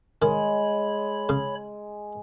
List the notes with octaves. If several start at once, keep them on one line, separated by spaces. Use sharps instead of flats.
D#3 G#3 C#5 B5
C#3